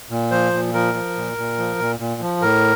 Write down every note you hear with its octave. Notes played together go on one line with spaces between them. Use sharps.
A#2
F3 C5
A#2
F3 A#4
F3
A#2
A#2
F3
A#2
A#2
F3
A2 A#4